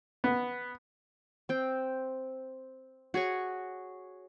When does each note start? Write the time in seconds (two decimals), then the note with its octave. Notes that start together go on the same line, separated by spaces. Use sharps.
0.24 B3
1.49 C4 G5
3.14 F#4 G#4 C#5 C#6